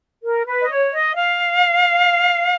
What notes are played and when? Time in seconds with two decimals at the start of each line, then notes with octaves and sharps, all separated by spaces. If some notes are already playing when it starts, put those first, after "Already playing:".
0.23 A#4
0.46 B4
0.61 D#5
0.69 C#5
0.93 D#5
1.16 F5